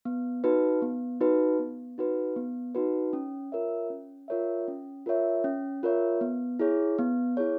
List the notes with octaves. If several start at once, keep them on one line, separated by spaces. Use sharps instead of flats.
B3
D#4 F#4 B4
B3
D#4 F#4 B4
B3
D#4 F#4 B4
B3
D#4 F#4 B4
C#4
F4 A#4 C#5 E5
C#4
F4 A#4 C#5 E5
C#4
F4 A#4 C#5 E5
C#4
F4 A#4 C#5 E5
B3
E4 G#4 C#5
B3
E4 G#4 C#5